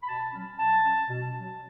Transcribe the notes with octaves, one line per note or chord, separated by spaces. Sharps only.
B5
B2 A5
F#3 C#4
B2 A5
F#3 C#4
B2
F#3 C#4